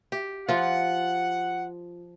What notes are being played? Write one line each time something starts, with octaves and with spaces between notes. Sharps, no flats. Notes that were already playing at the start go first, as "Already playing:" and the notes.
G4
F3 F4 F#5